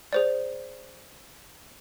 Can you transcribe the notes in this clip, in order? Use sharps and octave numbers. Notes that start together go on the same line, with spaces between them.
G#4 C5 D5